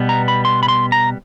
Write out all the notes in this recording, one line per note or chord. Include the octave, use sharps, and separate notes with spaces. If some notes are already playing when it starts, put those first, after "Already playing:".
Already playing: B2 G3 B3
A#5
B5
C6
B5
C6
A#5